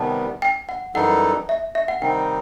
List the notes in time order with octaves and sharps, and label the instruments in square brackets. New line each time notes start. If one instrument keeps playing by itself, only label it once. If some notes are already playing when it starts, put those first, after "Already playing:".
Already playing: [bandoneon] C3 D#3 G3 B3 [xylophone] A5
[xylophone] G5
F#5
[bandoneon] F#2 E3 G3 D#4 A4 [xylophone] F#5
[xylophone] E5
E5
F#5
[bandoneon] C3 D#3 G3 C4 D#4 [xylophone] G5